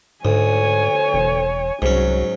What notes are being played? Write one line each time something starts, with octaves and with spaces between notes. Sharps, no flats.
D2 G#2 C#5 G#5
E1
C2 G#2 F#3 C#4